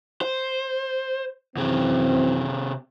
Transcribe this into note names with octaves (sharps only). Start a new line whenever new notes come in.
C5
F#2 C3 E3 C4 G#4